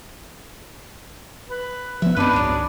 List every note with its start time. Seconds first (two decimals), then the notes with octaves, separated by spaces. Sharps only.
1.48 B4
2.02 F1 F3 B3 E5
2.17 F#2 B3 C4 D4 D#4 B4
2.33 G#1 C#2 F#3 G#4